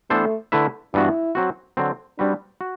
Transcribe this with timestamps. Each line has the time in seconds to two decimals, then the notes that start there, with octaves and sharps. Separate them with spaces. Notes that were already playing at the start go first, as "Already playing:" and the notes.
0.10 E3 A3 B3 D4 A4 C5
0.52 D3 A3 E4 B4 E5
0.94 G2 E3 B3 D4 E4 F#4
1.35 F#3 C4 F#4
1.77 D3 F#3 C4
2.19 G3 C4 D4 F#4 B4
2.61 F#4